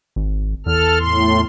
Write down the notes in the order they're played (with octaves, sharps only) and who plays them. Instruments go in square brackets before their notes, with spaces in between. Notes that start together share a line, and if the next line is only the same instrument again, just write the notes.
[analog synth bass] G#1
[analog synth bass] E2 [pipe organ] A4 F6
[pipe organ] A2 C6